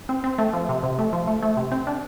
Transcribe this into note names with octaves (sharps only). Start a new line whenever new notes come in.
C4
C4
A3
F3
C3
C3
A3
F3
A3
A3
C3
C4
D4